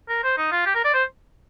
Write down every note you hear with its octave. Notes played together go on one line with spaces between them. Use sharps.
A#4
C5
D#4
F4
G4
A#4
D5
C5